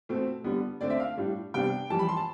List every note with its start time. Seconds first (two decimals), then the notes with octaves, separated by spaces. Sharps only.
0.09 B2 A3 C4
0.44 D3 G3 B3
0.81 D3 A3 C4 D5
0.90 E5
1.00 F5
1.17 A2 G3 D4
1.54 C3 G3 B3 D4 G5
1.90 F2 E3 G3 A5
1.99 B5
2.08 C6
2.17 A5